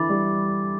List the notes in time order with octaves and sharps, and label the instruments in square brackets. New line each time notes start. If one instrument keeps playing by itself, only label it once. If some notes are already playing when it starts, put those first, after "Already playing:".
Already playing: [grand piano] D3 E3 [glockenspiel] B5 D6 A6
[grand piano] G3